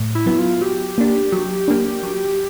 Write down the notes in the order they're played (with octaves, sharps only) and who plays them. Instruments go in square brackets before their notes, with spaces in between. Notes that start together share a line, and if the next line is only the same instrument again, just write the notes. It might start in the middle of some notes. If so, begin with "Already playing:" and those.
Already playing: [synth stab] A2
[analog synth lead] E4
[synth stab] F#3 B3
[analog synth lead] F4
[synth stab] F#3 [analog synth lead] G4
[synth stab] A#3 D4
F#3
A#3 D4
F#3